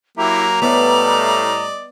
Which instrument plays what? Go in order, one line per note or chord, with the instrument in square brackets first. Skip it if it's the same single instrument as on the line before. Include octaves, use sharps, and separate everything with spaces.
[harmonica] F#3 A#3 [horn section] E4 G4 [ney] A#5
[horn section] A2 [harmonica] G3 D5 D#5 [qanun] B3